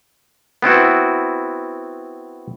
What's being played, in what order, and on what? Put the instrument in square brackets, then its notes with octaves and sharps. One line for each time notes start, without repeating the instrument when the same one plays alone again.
[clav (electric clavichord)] B3 C4 E4 F#4